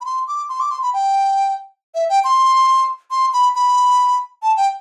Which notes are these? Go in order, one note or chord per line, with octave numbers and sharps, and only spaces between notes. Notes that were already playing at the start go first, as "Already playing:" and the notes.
B5
C6
D6
C6
D6
C6
B5
G5
E5
G5
C6
C6
B5
B5
A5
G5